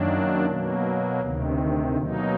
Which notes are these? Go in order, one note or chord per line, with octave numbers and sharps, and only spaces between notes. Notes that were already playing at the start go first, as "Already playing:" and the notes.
Already playing: F#2 D#3 F#3 A#3 D4
B2 F#3 A#3
D2 C3 D#3
B2 F#3 A#3 D#4